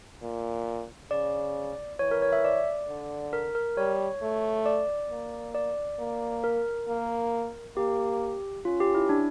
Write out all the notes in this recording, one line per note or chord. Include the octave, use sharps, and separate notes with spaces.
A#2
C#3 D5
E3 C#5
A#4
C#5
E5
D5
D3
A#4
A#4
G3 C#5
A3
D5
A#3
D5
A#3
A#4
A#3
A#3 G4
C#4 F4
G4
E4
D4